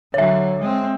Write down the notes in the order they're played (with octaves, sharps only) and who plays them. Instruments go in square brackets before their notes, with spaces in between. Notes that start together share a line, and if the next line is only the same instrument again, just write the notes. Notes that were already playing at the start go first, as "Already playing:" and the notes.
[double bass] D3 F#3 [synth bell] C#5 E5
[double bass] G#3 C4